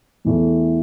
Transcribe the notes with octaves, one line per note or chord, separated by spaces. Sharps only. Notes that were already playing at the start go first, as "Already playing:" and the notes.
E2 E3 A3 E4